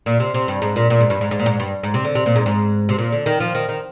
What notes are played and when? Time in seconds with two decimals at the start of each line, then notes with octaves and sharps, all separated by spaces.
0.06 A#2
0.20 C3
0.34 C3
0.48 G2
0.62 G#2
0.76 A#2
0.90 A#2
1.00 G#2
1.10 G2
1.21 G#2
1.31 G#2
1.39 A#2
1.46 G#2
1.60 G2
1.83 G#2
1.94 C3
2.05 D3
2.15 C3
2.26 A#2
2.36 G#2
2.46 G#2
2.89 C3
2.98 A#2
3.12 D3
3.26 D#3
3.40 F3
3.55 D#3
3.69 D#3